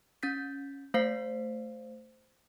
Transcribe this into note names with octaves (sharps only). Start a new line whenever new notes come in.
C#4 G6 A6 B6
A3 C5 F5 B6 C7